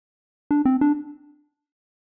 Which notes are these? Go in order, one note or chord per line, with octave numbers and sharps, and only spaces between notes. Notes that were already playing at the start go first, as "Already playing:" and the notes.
D4
C4
D4